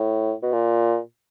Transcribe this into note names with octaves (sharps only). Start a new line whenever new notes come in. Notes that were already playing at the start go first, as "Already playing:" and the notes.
Already playing: A2
B2
A#2